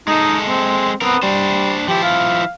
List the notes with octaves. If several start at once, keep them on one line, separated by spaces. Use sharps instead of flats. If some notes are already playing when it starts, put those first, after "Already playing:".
G#3 D#4 A4
C4
B3 C4 A#4
G3 D4 C5
F3 E4 G4
F5